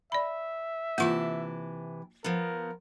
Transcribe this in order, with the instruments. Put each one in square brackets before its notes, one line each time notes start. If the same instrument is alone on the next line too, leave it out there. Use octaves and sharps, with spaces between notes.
[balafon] D5 B5 [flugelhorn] E5
[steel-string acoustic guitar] C3 E3 A5 [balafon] A#3 F4
[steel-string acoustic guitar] F3 B3 [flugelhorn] A#4